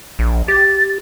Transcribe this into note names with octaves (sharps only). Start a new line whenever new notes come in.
A#1
G4 A6